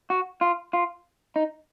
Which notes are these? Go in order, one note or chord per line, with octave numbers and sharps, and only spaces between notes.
F#4
F4
F4
D#4